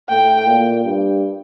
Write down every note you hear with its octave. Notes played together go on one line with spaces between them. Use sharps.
A2 G5
A#2
G2